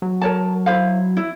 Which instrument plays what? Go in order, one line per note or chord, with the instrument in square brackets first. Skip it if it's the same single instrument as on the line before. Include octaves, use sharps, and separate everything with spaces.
[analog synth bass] F#3
[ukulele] A#4 C#5 A5
E4 C5 F5
E4